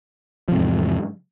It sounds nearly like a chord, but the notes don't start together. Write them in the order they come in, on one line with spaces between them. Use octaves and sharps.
F3 C3 G#2 E2